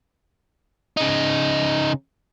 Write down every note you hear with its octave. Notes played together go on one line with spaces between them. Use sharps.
C#3 D#4